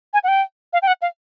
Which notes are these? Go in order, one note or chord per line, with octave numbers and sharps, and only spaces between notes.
G#5
F#5
G5
F5
G5
F#5
F5